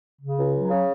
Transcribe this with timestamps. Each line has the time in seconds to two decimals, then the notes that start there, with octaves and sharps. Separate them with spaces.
0.21 C#3
0.37 C#2
0.54 F#3
0.70 C#3